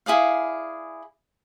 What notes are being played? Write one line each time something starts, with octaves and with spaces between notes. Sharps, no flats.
E4 G#4 D5 F5